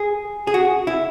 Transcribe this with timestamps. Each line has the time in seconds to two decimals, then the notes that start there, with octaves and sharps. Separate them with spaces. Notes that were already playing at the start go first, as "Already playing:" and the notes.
Already playing: G#4
0.47 G#4
0.54 F#4
0.87 E4